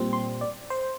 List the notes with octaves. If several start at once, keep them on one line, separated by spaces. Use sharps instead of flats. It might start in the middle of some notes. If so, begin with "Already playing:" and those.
Already playing: A#2 G3 C4
C6
D5
C5